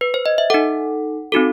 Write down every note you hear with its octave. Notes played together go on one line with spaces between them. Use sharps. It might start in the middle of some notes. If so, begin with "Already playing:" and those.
B4
C5
D#5
E5
D#4 A4 F#5
C4 D#4 F#4 A4